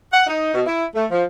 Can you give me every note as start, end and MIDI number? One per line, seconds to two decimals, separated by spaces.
0.13 0.25 78
0.27 0.50 63
0.54 0.62 47
0.67 0.84 64
0.95 1.05 57
1.10 1.24 53